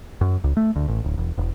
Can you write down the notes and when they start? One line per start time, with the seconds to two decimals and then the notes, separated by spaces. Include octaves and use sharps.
0.21 F#2
0.44 C#2
0.57 A3
0.76 D2
0.88 A1
1.04 D1
1.18 E1
1.38 E1